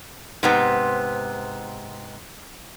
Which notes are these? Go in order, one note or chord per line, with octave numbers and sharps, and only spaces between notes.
G#2 C3 B3